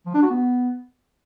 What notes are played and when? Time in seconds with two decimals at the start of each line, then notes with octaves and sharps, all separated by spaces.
0.06 F3
0.14 D4
0.22 F#4
0.30 B3